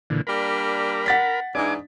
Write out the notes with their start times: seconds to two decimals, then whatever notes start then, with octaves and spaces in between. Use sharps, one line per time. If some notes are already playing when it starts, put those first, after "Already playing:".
0.10 A#2 D3 E3
0.27 G3 A#3 D4 A#4 B5
1.06 F#5 A6 B6
1.55 G#2 E3 D4 D#5 G#5 D6